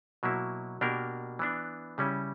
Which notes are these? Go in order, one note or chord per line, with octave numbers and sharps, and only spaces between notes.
B2 F#3 A#3 E4
B2 A#3 D4 G4 A#4
E3 B3 D4
C#3 G3 C#4 E4